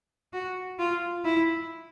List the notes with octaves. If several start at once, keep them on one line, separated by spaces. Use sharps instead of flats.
F#4
F4
E4